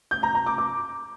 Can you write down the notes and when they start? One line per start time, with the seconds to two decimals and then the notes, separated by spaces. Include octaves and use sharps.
0.11 G6
0.23 A#5
0.35 A#5
0.46 D6
0.58 D6